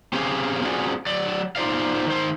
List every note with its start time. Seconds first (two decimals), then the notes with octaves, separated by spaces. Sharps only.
0.13 C4 C#4 G4 G#4 C5 F5
0.61 C4 C#4 F4 F#4 G#4 D5
1.06 F#3 D5
1.56 D#4 F4 C5 D5 F5
2.06 D#3 C5